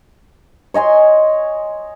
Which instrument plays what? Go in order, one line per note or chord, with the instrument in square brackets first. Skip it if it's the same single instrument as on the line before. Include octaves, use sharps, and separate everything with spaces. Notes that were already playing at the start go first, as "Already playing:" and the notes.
[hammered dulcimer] C#5 D#5 G#5 C6